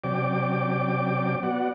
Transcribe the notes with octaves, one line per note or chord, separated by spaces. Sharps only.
C3 F#3 C#4 D5 G5 D6
B3 F#4 D5 F#5